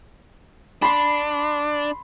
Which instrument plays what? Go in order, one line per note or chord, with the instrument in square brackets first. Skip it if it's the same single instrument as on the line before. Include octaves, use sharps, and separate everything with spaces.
[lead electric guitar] D4 [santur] B5 C6